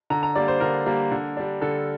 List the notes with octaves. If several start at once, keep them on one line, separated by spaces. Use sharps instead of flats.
D3 A#5
A#5
G3 A#3 D5
C5
D3 A#4
G3 A#3
D3
G3 D4
D3 A4